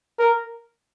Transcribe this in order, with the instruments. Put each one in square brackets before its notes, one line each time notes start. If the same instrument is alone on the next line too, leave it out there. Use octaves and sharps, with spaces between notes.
[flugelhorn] A#4